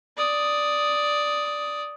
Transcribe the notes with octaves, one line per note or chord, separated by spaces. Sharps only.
D5 D#6